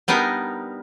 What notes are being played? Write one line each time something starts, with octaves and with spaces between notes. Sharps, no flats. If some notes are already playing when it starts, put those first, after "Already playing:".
G3 B3 D4 D#4 A#4